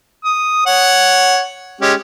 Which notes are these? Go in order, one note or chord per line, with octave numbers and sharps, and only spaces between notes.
D#6
C#5 F#5
G#3 C#4 G4